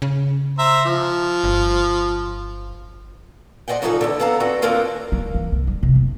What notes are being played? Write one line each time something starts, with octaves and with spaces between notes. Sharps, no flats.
C#3
C5 E5 A#5
F3
G1
C5 D5 D#5 F#5 G5
C#3 F3 F#3 D#4 G#4 A4
E2 G#2 D3
B3 A4 F5 A5 A#5
D3 C4 F#4 A4 B4
D#2 D3 D4 F4 A#4 F5
G3
E3
C2
G3
C3
E2